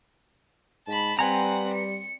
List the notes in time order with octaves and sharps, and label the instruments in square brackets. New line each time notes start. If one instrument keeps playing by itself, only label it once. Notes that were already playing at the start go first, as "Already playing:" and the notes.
[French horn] G#2 [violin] A5 B5
[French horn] G3 [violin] C4 F#5 [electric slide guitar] B4 G#5 A#5
[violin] C#7